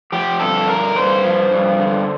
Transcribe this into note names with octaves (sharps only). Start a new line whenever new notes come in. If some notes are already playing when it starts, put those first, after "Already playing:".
F3 G4
G2 A4
D3 A#4
G2 C5
F3
G2
D3